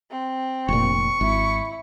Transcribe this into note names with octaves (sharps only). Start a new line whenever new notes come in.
C4
F1 A#2 C#6
G#1 E4